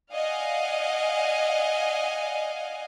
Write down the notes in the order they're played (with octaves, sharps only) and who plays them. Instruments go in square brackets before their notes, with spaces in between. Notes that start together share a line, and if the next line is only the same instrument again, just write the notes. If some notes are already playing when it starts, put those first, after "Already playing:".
[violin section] D5 D#5 F5 F#5 G#5